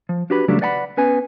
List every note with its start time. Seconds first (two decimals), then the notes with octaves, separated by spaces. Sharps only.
0.09 F3
0.30 D4 F#4 G4 B4 B5
0.48 E2 C#3 F#3 G3 A3 D4
0.61 B4 D5 F#5 G#5 B5
0.97 B3 C#4 B4 G#5